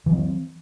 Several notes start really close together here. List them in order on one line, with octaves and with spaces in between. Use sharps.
E3 F#3 C4